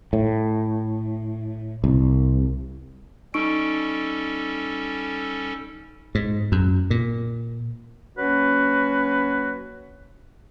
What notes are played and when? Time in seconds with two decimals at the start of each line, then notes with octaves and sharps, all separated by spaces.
0.13 A2
1.84 C2
3.34 G3 C#4 D#4 A4 C#6 D7
6.15 G#2
6.52 F#2
6.90 A#2
8.17 F#3 A#3 C#4 F#4 B4